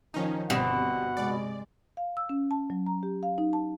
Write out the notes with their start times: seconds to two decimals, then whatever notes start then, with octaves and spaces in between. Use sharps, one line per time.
0.14 D#3 F3 C#4 D#4
0.50 G1 G2 B2 G3 C4 F#5
1.17 C3 G#3 D5
1.97 F5
2.17 E6
2.29 C#4
2.51 A5
2.70 F#3
2.86 A#5
3.03 G4
3.23 F5
3.38 D#4
3.53 A5